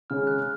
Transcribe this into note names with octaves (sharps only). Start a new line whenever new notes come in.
C#3 G#3 C#4 F6
F#6